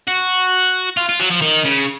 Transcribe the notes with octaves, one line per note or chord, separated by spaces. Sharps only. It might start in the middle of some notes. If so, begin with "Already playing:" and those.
F#4
F4
F4
F#3
F3
D#3
C#3